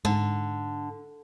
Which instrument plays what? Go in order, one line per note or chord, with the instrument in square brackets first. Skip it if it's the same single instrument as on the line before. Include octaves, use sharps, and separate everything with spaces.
[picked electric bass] G#2 [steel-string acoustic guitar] D3